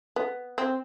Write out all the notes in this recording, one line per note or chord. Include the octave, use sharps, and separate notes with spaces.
B3
C4